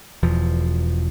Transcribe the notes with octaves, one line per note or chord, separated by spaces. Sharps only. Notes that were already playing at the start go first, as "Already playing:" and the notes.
E1 E2 F3